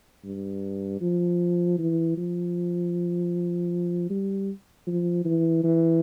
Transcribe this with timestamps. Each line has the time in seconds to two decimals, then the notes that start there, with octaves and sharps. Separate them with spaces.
0.24 G2
1.01 F3
1.78 E3
2.17 F3
4.10 G3
4.87 F3
5.25 E3
5.64 E3